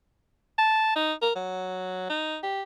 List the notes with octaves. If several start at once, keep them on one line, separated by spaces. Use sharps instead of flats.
A5
D#4
A#4
F#3
D#4
G4